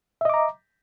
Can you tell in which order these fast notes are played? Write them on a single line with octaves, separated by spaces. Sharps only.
E5 D#5 D6 A#5